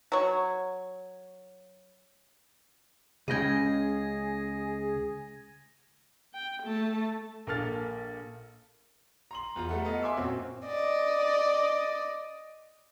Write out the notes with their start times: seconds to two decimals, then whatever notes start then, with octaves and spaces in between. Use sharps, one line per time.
0.12 F#3 C#5
3.28 C#2 C#3 G#3 G#4 G5 G#6 A#6 D#7
6.34 G5
6.63 A3 A5
7.47 A#1 A#3 A4 F6 A6
9.31 A#5 C6 F#7
9.56 E2 F4 A#5
9.69 G3 A3 A4 E5 F#5
9.85 B3 D#5 F5
10.03 E5 G#5 C6 D6 E6
10.17 F#2 A#2 C4 C#4 F#4
10.66 D5 D#5